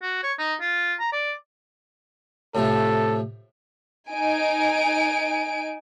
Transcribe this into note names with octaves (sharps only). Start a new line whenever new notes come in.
F#4
C#5
D#4
F4
A#5
D5
A2 C3 F3 A4
D#4 G#5 D7